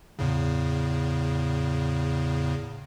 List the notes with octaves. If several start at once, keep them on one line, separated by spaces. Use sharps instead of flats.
E2 A2 C#3